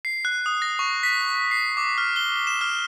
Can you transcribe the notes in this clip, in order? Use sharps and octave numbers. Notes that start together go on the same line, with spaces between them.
C7
F#6
D#6
A#6
C#6
B6
C7
D6
F6
G7
E7
F6